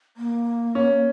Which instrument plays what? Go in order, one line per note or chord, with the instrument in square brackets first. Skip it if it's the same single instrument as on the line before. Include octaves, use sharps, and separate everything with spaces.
[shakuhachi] A#3
[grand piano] C#4